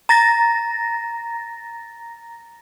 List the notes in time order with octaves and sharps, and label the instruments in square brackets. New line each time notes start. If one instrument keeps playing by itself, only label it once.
[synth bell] A#5 A6 A#6